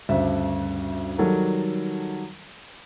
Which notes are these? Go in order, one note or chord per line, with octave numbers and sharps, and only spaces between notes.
D2 G2 C#3 D4 C5 E5
D#3 F#3 G3 A4 A#4